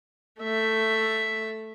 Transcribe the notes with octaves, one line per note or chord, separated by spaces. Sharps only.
A3 E5